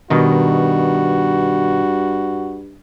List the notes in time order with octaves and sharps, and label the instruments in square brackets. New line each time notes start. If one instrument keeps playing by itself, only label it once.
[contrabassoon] G2 [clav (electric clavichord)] B2 D#3 D#4 [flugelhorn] F#4